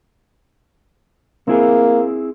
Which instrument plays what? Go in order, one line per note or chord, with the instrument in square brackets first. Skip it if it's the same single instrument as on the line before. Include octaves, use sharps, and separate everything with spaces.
[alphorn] A#3 [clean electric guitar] C4 E4 G#4